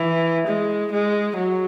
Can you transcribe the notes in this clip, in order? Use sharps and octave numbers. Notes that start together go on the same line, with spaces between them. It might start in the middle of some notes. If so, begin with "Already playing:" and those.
Already playing: E3
G#3
G#3
F#3